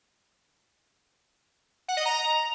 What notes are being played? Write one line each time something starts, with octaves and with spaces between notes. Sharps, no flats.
F#5
D#5
A#5